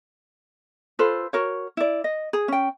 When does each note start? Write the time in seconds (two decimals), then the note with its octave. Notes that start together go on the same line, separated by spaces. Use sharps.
0.99 F4 A4 B4 C5
1.33 F#4 A#4 C#5
1.77 E4 D5
2.04 D#5
2.33 G#4
2.48 C#4 G5